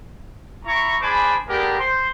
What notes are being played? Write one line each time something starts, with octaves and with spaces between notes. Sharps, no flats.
E4 A#5 C#6
D4 G#4 C5 G#5 B5 D6
A3 B3 D4 G4 G#4 A#4
C5 C6